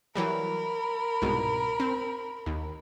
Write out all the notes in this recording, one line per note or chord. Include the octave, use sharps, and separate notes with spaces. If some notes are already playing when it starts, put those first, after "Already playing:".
E3 F#3 G3 A#4 B5
C2 G#2 B2
C4
D#2